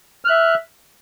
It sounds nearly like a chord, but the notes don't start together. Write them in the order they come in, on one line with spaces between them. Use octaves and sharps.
F6 F#6 E5